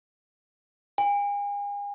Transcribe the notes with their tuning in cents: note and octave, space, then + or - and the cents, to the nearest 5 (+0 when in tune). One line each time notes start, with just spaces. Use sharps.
G#5 -40